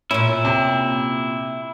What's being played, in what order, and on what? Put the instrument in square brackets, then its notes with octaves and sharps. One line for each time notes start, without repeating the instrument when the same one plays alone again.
[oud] A#2 C#4 [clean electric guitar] E4
[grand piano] C3